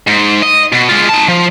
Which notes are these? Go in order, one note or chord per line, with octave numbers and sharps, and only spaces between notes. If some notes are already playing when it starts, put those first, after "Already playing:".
G#2
D#5
B2
G#3 F4
D#4 A5
F3